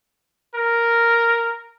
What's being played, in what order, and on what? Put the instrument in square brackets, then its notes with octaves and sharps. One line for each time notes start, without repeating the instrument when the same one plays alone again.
[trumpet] A#4